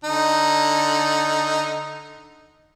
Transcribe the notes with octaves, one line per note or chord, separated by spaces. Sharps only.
D3 D#4